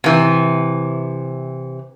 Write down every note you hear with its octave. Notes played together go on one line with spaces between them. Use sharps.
C3 E3